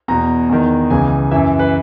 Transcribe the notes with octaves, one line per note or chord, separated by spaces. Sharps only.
E2 B2 A#5
E2 D#3
C#2 C#3 E3 G#5
F#2 E3 E5
B4